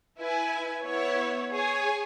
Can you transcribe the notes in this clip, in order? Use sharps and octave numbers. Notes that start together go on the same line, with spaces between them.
E4 B4 G#5
B3 E4 C#5
G#4 C#5 G#5